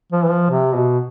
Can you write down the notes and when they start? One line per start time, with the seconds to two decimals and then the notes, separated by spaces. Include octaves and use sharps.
0.12 F3
0.23 E3
0.30 F3
0.50 C3
0.76 B2